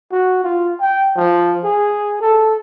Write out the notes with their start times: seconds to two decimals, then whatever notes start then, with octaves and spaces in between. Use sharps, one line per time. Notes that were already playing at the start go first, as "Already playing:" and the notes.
0.12 F#4
0.44 F4
0.80 G5
1.16 F3
1.64 G#4
2.21 A4